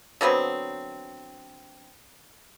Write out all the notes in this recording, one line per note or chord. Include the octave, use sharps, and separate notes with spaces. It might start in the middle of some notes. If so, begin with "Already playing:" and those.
D3 F#3 B3 C4